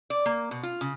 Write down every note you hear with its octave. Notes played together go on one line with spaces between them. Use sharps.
D5
A#3
B2
F4
C#3